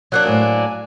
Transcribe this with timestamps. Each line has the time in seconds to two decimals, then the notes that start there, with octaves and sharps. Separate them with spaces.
0.12 F#3 A#3 D4 F#6
0.26 A2 C5 D#5 G#5